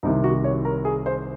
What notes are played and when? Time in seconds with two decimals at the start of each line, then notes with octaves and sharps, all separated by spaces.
0.03 C2 C3 D#3 D#4
0.24 F#4
0.44 C#5
0.65 A#4
0.85 G#4
1.06 C5